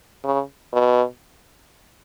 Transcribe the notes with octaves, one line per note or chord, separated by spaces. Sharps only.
C#3
B2